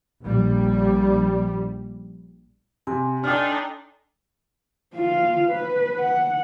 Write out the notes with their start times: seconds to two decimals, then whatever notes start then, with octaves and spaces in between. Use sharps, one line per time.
0.22 A#1 G3
2.87 C3 G#5 C6
3.24 D4 D#4 A4 G5 F6
4.95 F4 F5
5.49 B4
6.00 F#5